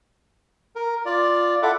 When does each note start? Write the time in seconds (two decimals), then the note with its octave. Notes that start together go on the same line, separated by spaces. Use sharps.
0.76 A#4
1.05 F4 D5
1.62 E4 F4 A4 E5 F#5 D6